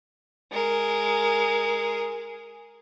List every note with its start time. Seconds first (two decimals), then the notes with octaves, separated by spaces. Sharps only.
0.52 G#3 A#4